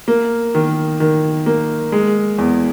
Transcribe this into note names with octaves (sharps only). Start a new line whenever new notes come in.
A#3
D#3
D#3
A#3
G#3
E2